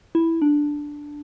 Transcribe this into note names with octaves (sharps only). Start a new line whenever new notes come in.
E4
D4